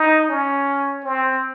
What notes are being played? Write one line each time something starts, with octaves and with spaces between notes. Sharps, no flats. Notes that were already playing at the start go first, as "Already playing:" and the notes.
Already playing: D#4
C#4
C4